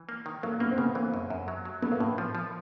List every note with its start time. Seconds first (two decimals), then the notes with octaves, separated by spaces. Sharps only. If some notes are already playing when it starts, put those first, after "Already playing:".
Already playing: E3
0.09 A#3
0.26 D#3
0.43 F#3 A#3
0.60 A#3 B3
0.71 C4
0.78 C#3 B3
0.95 E3 A#3
1.14 F#2
1.30 F#2
1.48 F#3
1.65 F#3
1.82 F#3 B3
1.92 A#3
2.00 A2 B3
2.18 F3
2.35 F3